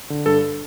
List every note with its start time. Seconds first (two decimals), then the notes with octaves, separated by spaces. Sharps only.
0.10 D3
0.26 G2 A4